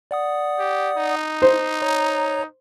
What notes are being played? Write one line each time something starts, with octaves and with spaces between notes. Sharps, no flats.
D5 F#5 D#6
G4
D#4
C5
C#5 A#5